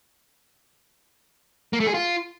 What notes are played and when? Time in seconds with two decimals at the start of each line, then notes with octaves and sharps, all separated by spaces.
1.73 A#3
1.80 A3
1.87 G#4
1.94 F4